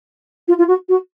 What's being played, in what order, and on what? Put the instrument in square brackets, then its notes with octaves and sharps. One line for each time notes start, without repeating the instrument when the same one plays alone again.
[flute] F4
F4
F#4
F#4